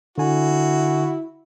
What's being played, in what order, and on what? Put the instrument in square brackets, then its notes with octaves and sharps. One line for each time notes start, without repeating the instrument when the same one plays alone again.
[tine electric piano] D3 G#5 [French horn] E4 [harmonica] F#4